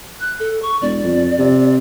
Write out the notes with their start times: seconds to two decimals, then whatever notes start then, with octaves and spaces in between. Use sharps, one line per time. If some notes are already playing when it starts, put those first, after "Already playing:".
0.20 F#6
0.40 A4
0.62 C#6
0.82 E1 D5
1.04 F2
1.38 C3